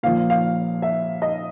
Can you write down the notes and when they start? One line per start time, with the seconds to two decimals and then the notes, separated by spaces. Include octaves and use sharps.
0.03 A#2 F3 F5
0.30 F5
0.82 E5
1.22 D#5